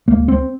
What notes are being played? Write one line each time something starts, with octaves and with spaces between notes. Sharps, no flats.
C#2 A#3
C#2
C4